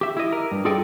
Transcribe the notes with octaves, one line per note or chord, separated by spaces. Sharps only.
G4 E5
E4 D#5
A#4
G2
F4 G#4 A4 D5 D#5 G5